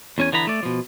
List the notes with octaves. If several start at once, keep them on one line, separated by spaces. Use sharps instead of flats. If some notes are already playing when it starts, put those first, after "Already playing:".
E2 C#4 G#5
D3 E3 B3 A#5 B5
A3 D5
B2 F3